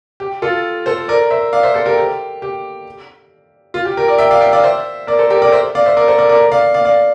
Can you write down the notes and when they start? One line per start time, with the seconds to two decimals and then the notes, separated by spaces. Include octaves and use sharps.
0.20 G4
0.42 F4 A4
0.86 A4 C5
1.08 A#4 D5
1.31 C5 E5
1.53 D5 F5
1.63 C5 E5
1.74 A4 C5
1.86 G4 A#4
1.98 G4
2.42 G4
3.74 F4
3.85 G4
3.97 G4 A#4
4.08 A#4 D5
4.19 E5 G5
4.31 D5 F5
4.41 E5 G5
4.52 D5 F5
4.63 C5 E5
5.07 A#4 D5
5.19 A4 C5
5.30 G4 A#4
5.42 A#4 D5
5.52 C5 E5
5.75 D5 F5
5.86 C5 E5
5.97 A#4 D5
6.08 A4 C5
6.18 A#4 D5
6.29 A#4 D5
6.52 D5 F5
6.74 D5 F5
6.85 D5 F5